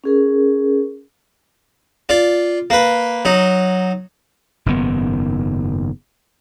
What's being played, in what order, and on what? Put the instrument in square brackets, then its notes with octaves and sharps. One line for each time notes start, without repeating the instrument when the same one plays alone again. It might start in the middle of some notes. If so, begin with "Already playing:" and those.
[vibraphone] C#4 G#4 A#4
[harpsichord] F4 D5
A#3 B4
F#3 D#4
[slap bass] F#1 G#2 D#3 B3